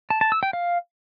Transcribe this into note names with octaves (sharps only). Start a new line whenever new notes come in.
A5
A5
E6
G5
F5